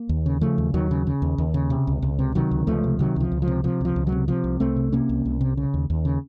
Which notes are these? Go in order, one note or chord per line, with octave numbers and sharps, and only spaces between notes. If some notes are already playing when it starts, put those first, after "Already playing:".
Already playing: A#3
D#2
C#3
C#3 F3 A3
D#2
D#2 D#3 F#3
C#3
C#3
D#2
D#2
C#3
C3
C#2
C#2
C3
C3 D#3 F#3
C#2
C#2 F3 A3
C3
C3 D#3 F#3
C#2 F3
C#2
F3
C3
C3 F3
C#2 F3
C#2
D#3 F#3
C3
C3 F3
C2
C2 A3 C4
C3
C3 A#3 C#4
C2
C2
C3
C#3
D#2
D#2
C#3